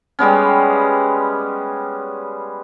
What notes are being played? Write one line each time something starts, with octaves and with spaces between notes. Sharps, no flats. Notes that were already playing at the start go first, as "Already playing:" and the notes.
G3 G#3 B3 C#4